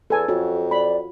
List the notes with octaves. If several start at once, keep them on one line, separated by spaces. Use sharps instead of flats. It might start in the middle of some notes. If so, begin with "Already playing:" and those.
E2 A4 G#5
F2 F4 F#4 C#5
D5 B5